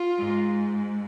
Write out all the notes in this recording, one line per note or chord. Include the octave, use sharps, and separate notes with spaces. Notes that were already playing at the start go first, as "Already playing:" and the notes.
Already playing: F4
G#2